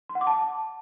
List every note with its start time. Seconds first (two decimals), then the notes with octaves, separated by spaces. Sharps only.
0.09 C6
0.15 F#5
0.21 D6
0.27 A5